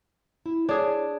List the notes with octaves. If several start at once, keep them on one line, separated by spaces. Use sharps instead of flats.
E4
D4 G#4 C#5 D5